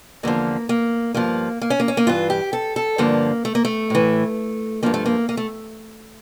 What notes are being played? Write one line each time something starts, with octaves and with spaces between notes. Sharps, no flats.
E2 D3 F3 A#3
A#3
G2 F3 A#3
A#3
C#4
A#3
C#4
A#3
G2 E3 F4
G4
A4
A4
G2 D3 F3 A#3
A3
A#3
A3
A2 E3
G2 F3 A#3
A3
A#3
A#3
A3